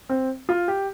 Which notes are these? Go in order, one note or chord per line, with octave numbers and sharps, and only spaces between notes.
C4
F4
G4